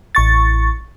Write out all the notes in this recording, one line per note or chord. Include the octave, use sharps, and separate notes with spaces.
A1 C#6 A6